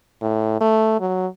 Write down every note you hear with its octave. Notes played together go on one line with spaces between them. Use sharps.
A2
A3
F#3